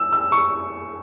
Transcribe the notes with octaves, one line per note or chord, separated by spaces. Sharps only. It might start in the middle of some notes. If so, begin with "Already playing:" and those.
Already playing: E6
E6
C#6